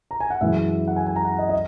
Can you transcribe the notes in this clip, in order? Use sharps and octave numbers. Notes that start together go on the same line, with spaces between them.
A#5
G#5
F#5
F#2 E3 G#3 E5
F#5
G#5
G#5
A#5
F#5
D#5
D#5